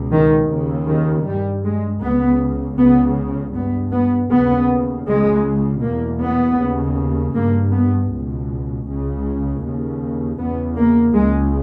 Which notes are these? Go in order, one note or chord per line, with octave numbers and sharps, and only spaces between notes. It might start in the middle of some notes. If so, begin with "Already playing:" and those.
Already playing: C#2 B2
D#3
D#2 C#3
D#3
G2 G3
G#3
C#2 C#3 B3
C#2 C#3 B3
G2 B3
B3
D#2 C#3 B3
C#2 C#3 G#3
B2 A#3
E2
B3
D#2 C#3
G2 A#3
B3
C#2 B2
C#2 C#3
D#2 C#3
E2 C#3 B3
A#3
C#2 C#3 G#3